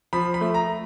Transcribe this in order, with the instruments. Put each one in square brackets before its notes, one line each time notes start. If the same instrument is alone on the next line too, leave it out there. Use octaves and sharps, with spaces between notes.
[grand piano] F3 B5
B5
A3
A#5